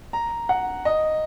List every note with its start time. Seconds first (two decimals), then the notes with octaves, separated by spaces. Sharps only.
0.13 A#5
0.49 F#5
0.85 D#5